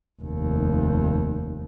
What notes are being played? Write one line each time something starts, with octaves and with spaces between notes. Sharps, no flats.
F1 D#2